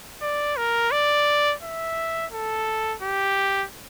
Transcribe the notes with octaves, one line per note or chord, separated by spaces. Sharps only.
D5
A#4
D5
E5
A4
G4